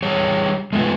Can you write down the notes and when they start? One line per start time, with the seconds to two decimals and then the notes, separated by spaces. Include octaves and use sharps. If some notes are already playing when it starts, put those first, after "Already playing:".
0.02 G3 G#4 C#5
0.73 G#3 A3 B3 F4